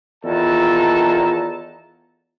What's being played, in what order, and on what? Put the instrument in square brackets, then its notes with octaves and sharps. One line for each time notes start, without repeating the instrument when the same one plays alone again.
[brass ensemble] E2 D#3 F4 A4 A5 A#5